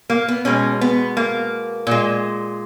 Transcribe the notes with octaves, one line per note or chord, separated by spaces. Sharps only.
A#3
B3
B2 G#3 C#4
B3
A#3
A#2 G#3